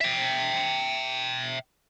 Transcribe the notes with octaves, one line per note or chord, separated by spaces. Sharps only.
E5 G5